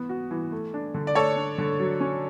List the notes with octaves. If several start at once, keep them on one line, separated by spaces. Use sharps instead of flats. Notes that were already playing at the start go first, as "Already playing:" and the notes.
Already playing: E3 B3
F#4
E3
A3
D4
D3
D5
A3 A4 C#5
D4
D3
F#3
C#4